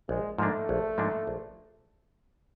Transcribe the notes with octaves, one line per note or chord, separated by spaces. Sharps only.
A#1 G#3
G#2 F3 A3 A#3 D4
A#1
G#2 F3 A#3 D4
A#1